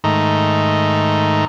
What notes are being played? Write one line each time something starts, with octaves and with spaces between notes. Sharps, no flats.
G#2 D#3 A3 D#4